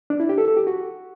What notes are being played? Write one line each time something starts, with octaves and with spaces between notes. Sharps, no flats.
D4
E4
G4
A4
A4
G4
F#4